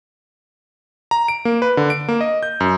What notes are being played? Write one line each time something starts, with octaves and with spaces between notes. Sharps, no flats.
A#5
D7
A#3
B4
D3
D7
A#3
D#5
G6
F#2